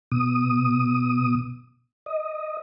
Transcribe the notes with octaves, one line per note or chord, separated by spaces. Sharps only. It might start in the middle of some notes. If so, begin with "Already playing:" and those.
B2 D#6
D#5